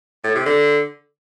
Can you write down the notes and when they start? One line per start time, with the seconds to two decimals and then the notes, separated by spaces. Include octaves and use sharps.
0.24 A2
0.35 C3
0.46 D3